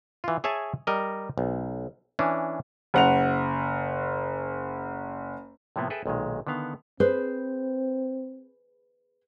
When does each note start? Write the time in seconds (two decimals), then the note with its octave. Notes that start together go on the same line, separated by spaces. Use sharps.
0.24 E3 F4
0.44 G#4 C#5 E5 G#5 A5
0.87 G3 A#4 D#5
1.38 B1
2.19 E3 C#4 D4
2.94 F#1 F#5 F7
5.76 A2 C3 F3 A#3 B3
5.90 G#4 A4 B4 E5 G5
6.06 B1 A#2 D#3 G#3
6.47 D3 D#3 B3 F5
7.00 C4 G#4 B4 C5